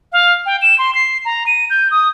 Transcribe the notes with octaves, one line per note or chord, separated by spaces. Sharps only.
F5
G5
E7
C6
C7
A#5
D#7
G6
D#6